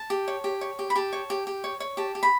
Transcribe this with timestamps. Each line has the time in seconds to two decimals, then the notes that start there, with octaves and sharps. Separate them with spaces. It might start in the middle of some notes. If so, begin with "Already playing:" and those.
Already playing: A5
0.10 G4
0.28 C#5
0.44 G4
0.61 C#5
0.79 G4
0.90 B5
0.96 G4 A5
1.13 C#5
1.30 G4
1.47 G4
1.64 C#5
1.80 C#5
1.97 G4 A5
2.15 G4
2.23 B5